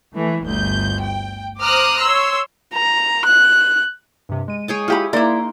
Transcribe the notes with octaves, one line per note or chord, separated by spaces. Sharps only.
E3 A3
G1 D2 G6
G5
C5 A#5 D6 D#6 F6 F#6
C#5 C6 E6
A#5
F#6
G2 C3
G#3 D#7
G#4 C#5 G5
E4 F4 G4 B5
A#3 D#4 E4 A#4 D5 C6